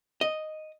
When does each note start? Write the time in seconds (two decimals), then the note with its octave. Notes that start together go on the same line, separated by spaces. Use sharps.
0.21 D#5